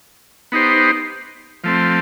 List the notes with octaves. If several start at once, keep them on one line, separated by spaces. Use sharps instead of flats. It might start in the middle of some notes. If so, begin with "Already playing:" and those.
B3 D#4 G4 C5
F3 A3 C4